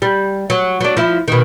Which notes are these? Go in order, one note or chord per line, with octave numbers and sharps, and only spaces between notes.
G3
F#3
F#3 D4
F3 E4
B2 D#3